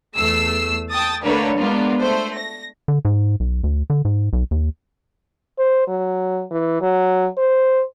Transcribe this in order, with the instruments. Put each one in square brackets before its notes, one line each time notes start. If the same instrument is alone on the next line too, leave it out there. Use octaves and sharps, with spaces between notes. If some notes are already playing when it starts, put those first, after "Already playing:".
[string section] E2 A3 E6 C7
G5 A5 D#6 A6
D3 A3 A#3 D4 B4 C#5
G#3 A#3 B3 D4 F4
A3 C5
A#6
[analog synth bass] D3
G#2
B1
D2
D3
G#2
B1
D#2
[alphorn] C5
F#3
E3
F#3
C5